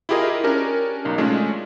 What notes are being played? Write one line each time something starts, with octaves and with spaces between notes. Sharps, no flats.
E4 F4 G4 G#4 A#4 D#5
C#4 D4 G4 A#4
B1 D#4
G#3 A3 C#4 D4 F4 G#4